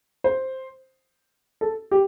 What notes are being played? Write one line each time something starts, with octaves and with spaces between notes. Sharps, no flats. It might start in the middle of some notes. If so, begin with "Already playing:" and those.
C5
A4
G4